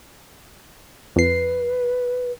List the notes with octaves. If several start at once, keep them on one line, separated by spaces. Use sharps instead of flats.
F2 B4 C7